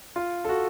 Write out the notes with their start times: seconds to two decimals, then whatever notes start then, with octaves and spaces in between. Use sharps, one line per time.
0.16 F4
0.44 A4
0.49 F#4